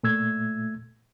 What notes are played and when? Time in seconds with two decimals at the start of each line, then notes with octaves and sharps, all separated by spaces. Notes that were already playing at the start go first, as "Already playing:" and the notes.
0.03 A#2 A3 E6 G#6